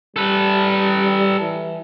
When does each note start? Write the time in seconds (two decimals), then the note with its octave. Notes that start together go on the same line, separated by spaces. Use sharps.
0.16 G3 A4 B4
1.40 E3